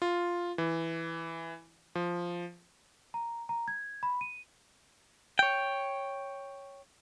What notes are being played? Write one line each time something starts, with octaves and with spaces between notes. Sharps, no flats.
F4
E3
F3
A#5
A#5
G#6
B5
D#7
C#5 G5